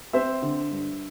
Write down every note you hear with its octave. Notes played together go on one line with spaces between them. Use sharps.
C4 C5 E5
D3
G2